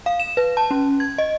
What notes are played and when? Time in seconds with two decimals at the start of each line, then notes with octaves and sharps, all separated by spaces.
0.06 F5
0.20 E7
0.37 B4
0.57 A5
0.71 C#4
1.00 G#6
1.18 D#5